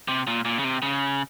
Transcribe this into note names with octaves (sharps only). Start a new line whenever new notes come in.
C3
A#2
A#2
C#3
C3
C#3